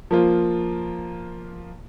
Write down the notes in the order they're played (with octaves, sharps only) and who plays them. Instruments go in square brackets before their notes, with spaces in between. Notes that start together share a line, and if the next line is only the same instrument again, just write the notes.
[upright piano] F3 A#3 F4